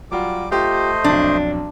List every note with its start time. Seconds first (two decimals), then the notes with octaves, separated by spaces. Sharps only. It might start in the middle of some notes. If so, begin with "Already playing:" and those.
0.12 F#3 G3 F4 F#4 D6
0.51 A3 F4 G4 C5 D#5
1.04 B1 F2 D4